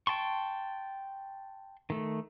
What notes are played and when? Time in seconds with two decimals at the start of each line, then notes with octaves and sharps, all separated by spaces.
0.07 G5 A5 C6 C#6
1.90 D#3 A3